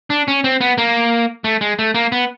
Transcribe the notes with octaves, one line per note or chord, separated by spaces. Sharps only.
D4
C#4
C4
B3
A#3
A3
G#3
A3
A#3
B3